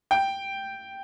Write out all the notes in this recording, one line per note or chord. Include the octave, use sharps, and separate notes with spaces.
G5